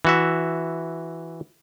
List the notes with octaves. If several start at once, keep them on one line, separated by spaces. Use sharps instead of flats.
E3 F#4 E5